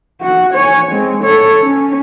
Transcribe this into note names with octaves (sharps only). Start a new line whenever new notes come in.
F#4 F#5
C#5 G#5
G#3 C4
A4 C#5
C#4